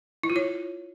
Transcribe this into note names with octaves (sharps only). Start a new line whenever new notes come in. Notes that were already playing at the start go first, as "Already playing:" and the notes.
E4
F4
C#5